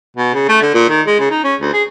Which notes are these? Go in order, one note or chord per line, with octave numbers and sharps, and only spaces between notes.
B2
C#3
A3
D3
A#2
D#3
G#3
C#3
D#4
C#4
D2
G#4